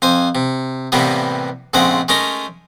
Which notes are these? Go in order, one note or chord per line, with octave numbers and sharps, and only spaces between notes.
F2 C5 G#5
C3
A2 C3 E3 G3 A#3 B3
A#1 C#3 G#3 A3 C4 F#5
G#3 A3 C#4 D#4 A#4